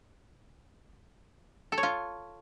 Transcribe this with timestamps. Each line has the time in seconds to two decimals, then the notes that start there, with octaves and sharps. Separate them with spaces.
1.72 A4
1.78 C#5
1.83 F4